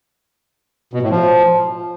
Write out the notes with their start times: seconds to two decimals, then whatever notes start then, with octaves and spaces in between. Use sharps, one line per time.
0.93 B2
1.02 A2
1.11 F3